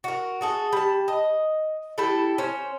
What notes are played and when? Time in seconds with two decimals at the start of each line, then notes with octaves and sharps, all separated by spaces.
0.04 F#4 A#4
0.41 F#4 G#4 A4
0.73 G3 A5
1.08 D#5
1.98 G3 A3 E4 A4
2.38 C#4 C5